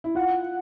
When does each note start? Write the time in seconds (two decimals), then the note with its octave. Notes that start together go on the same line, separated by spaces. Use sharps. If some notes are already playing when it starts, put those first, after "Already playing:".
0.04 E4
0.15 F4 F#5